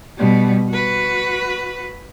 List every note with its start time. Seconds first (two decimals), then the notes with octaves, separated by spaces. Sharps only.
0.17 B2 G3
0.70 F#4 B4